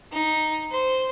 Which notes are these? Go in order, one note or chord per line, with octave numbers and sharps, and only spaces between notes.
D#4
C5